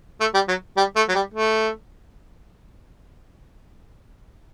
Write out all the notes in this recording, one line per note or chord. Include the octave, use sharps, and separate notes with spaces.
A3
G3
F#3
G3
A3
F#3
G3
A3